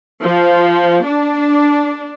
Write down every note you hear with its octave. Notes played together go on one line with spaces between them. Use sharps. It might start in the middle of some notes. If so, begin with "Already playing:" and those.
F3
D4